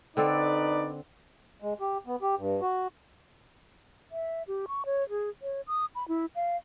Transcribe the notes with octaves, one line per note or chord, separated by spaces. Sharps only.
D3 C4 D#4 A4 B4 D5
G#3
G4
B3
G4
G2
F#4
E5
G4
C#6
C#5
G#4
C#5
D#6
B5
E4
F5